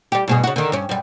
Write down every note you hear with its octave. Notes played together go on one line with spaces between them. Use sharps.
G3 G4
G2 B2 G#4
C#3 F#4
D3 D#3
G2 C#4
F#2 G3